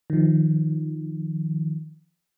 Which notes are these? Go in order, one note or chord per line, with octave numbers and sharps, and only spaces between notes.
D#3 F3